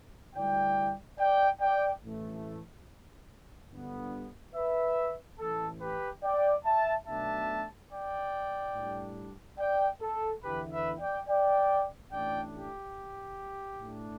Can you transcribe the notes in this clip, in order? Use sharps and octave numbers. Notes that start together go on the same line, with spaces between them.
D2 D3 G3 E4 D5 G5
D5 G5
D5 G5
A1 A2 E3 A3
G1 G2 D3 B3
B4 E5
A1 A2 E3 A4
G4 B4
D5 G5
E5 A5
B1 B2 A3 D4 E5 A5
D5 G5
A2 G3 D4
D5 G5
A4
E2 D3 B3 E4 G4 B4
B4 E5
D5 G5
D5 G5
A1 A2 A3 D4 D5 G5
G4
A2 A3 D4